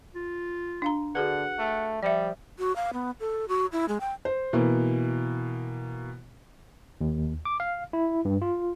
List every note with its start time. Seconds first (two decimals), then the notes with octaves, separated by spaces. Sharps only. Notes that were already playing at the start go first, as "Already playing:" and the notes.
0.15 F4
0.82 D4 F5 A#5
1.15 D3 F#4 G#4 B4 F#5
1.59 A3
2.03 F3 G3 D5 E5
2.59 F#4
2.76 F5
2.93 B3
3.20 A4
3.49 F#4
3.72 E4
3.89 G#3
4.00 G5
4.25 C5
4.53 B2 E3 A#3
7.01 D#2
7.45 D6
7.60 F5
7.93 E4
8.25 G2
8.42 F4